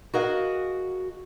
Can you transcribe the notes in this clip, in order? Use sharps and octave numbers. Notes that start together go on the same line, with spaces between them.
F#4 G#4 A#4 D#5 F5 F#5